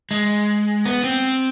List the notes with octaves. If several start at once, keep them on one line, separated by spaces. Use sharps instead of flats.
G#3
B3
C4